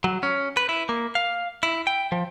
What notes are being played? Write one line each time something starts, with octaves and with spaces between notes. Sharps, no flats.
F#3
C#4
B4
E4
A#3
F5
E4
G5
F3